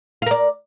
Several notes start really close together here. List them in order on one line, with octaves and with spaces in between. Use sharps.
F5 A#4 D5